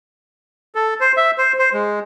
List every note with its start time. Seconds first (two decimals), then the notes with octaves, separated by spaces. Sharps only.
0.75 A4
1.00 C5
1.17 E5
1.38 C5
1.59 C5
1.73 G#3